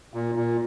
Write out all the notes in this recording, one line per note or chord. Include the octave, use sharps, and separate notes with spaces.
A#2
A#2